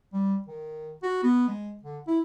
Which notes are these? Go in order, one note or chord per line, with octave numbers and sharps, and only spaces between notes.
G3
D#3
F#4
B3
G#3
D3
E4